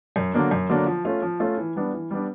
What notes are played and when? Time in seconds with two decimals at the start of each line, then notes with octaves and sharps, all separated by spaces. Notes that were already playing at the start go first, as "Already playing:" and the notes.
0.16 F#2
0.34 D3 F#3 A#3 D4
0.51 F#2
0.69 D3 F#3 A#3 D4
0.86 F3
1.05 A3 C#4 F4
1.22 F3
1.40 A3 C#4 F4
1.58 E3
1.76 G3 B3 D4
1.93 E3
2.11 G3 B3 D4